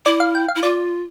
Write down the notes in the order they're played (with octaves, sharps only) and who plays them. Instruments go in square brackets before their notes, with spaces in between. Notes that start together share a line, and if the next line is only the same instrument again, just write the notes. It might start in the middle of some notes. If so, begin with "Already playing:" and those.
[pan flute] E4 [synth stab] D5
[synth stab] F5
G5
F5
[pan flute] E4
[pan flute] F4 [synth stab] D5